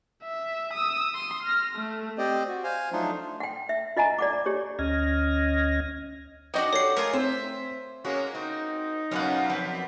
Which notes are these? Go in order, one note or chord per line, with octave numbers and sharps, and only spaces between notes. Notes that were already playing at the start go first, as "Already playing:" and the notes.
E5
D#6 E6
C6 D#6
F6 A#6
A3
C4 G4 C5 D5 D#5
F#4
C5 F5 G#5
F3 F#3 A3 D4 D#4 F4
F#5 G5
E5
F4 D#5 F#5 G#5 A#5
D5 F#5 D6
G4 C#5
D2 C#4 D#5 F6 G#6 A#6
D4 D#4 F#4 D5 D#5 G5
G4 A4 C#5 C7
A3 F4 G#4 A#4
C4 C5 E5
G#3 A#3 C#4 F#4
C4 D#4
F#2 B2 C#4 D4 F4 F#5
F3 C4 B4